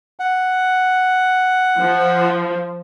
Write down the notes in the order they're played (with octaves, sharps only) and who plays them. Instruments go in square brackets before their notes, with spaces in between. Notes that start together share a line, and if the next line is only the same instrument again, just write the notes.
[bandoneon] F#5
[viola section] F3